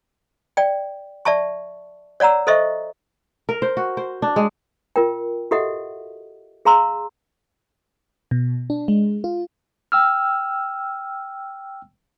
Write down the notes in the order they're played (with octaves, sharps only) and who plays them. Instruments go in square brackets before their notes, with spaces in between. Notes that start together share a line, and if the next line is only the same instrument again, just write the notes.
[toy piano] D5 G5
D5 E5 A5 C#6
C#5 D5 F#5 A#5 E6
A4 C5 D#5 E5 C#6
[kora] A#4
C5
F#4
C5
D4
G#3
[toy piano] F4 A#4 G5
F#4 G4 A4 D#5 E5 F#5
G#4 F5 A#5 C6 E6
[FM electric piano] B2
D4
G#3
F4
[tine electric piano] G5 E6 F6